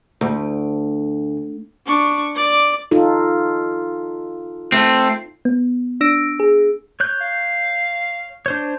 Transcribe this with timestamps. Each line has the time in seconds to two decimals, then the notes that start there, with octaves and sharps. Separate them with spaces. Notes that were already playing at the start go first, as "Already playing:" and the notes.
0.21 D2
1.86 D4 C#6
2.35 D5 D6
2.91 D#4 F4 A4
4.72 A3 C4
5.45 B3
6.01 D4 E6 A#6 D7
6.40 G#4
7.00 C#5 F#6 G6
7.21 F5
8.46 D4 C5 C#5